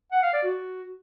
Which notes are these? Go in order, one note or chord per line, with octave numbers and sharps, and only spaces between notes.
F#5
F5
D5
F#4